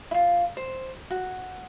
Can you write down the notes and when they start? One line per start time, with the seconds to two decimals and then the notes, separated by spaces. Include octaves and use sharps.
0.11 E4 F4
0.57 C5
1.11 F#4